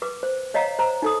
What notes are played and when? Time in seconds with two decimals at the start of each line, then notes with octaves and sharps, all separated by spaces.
0.02 B4 D6
0.23 C5
0.54 C#5 D#5 F5 F#5 A#5
0.79 C5 A#5
1.02 D#4 A4 D#6